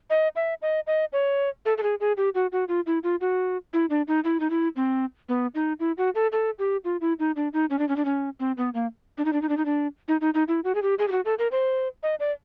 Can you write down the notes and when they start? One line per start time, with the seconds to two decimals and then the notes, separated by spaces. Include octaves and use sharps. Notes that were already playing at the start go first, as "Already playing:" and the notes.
0.10 D#5
0.36 E5
0.62 D#5
0.87 D#5
1.13 C#5
1.65 A4
1.78 A4
1.83 G#4
2.00 G#4
2.17 G4
2.35 F#4
2.52 F#4
2.68 F4
2.87 E4
3.04 F4
3.21 F#4
3.73 E4
3.90 D4
4.08 D#4
4.24 E4
4.40 D#4
4.50 E4
4.76 C4
5.29 B3
5.55 D#4
5.80 E4
5.98 F#4
6.15 A4
6.32 A4
6.59 G4
6.85 F4
7.01 E4
7.19 D#4
7.36 D4
7.53 D#4
7.70 C#4
7.79 D4
7.89 C#4
7.96 D4
8.05 C#4
8.40 C4
8.57 B3
8.74 A#3
9.18 D4
9.25 D#4
9.33 D4
9.42 D#4
9.49 D4
9.57 D#4
9.65 D4
10.08 D#4
10.21 D#4
10.34 D#4
10.48 E4
10.64 F#4
10.75 G#4
10.82 G4
10.99 G#4
11.08 G4
11.12 F#4
11.25 A4
11.39 A#4
11.52 C5
12.03 D#5
12.20 D5